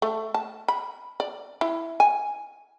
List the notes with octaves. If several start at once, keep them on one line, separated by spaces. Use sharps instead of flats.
A3
A5
B5
D5
E4
G#5